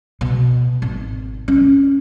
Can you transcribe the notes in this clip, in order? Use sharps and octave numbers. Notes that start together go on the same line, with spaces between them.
B2
G#1
C#4